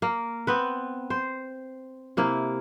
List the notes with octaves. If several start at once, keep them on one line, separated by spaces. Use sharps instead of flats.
A#3
B3 C4 B4
C5
C3 A#3 E4